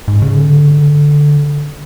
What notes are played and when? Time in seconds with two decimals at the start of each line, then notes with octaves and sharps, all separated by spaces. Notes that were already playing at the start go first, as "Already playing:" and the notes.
0.08 G#2
0.22 C#3
0.35 D3